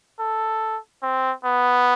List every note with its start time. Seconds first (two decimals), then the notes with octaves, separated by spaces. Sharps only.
0.20 A4
1.03 C4
1.45 B3